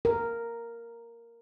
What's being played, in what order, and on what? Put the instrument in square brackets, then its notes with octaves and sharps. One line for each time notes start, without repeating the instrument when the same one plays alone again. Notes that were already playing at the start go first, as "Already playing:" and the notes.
[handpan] A#4